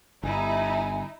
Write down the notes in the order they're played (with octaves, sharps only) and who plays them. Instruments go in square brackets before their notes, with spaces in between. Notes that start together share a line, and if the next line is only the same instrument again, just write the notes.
[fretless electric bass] G1 [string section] D#4 E4 [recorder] G#5